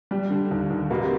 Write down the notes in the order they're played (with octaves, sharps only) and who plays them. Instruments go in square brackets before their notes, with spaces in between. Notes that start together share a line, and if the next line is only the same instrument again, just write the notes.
[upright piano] G3
D3
D#2
D#2
[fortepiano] B2 [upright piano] A#3
[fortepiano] C3